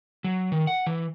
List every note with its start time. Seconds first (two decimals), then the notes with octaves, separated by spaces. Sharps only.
0.24 F#3
0.52 D#3
0.67 F#5
0.86 E3